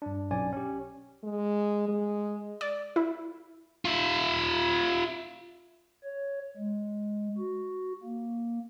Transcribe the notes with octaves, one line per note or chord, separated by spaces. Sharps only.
G2 D4
B1 C#4 D5 G#5
C#4 G4
G#3
G#3
D5
E4
F4 E5
C#5
G#3
F#4
A#3